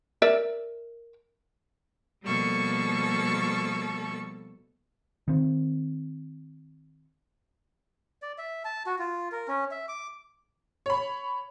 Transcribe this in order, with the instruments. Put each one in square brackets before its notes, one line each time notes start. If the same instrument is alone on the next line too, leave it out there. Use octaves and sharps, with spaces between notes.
[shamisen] A#4 D5 E5
[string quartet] B2 F3 G3 A#3 A4 C#6
[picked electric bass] D#3 C4
[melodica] D5
E5
A5
F#4
F4
A#4
C#4
E5
D6
[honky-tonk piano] C#5 B5